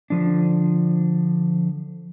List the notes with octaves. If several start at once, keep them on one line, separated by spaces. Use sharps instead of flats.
D3 F3 D4